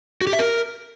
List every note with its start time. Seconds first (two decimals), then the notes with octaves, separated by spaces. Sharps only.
0.21 F#4
0.27 G4
0.33 E5
0.39 A#4